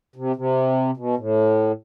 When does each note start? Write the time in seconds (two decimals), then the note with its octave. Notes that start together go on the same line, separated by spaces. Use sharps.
0.16 C3
0.36 C3
0.97 B2
1.17 A2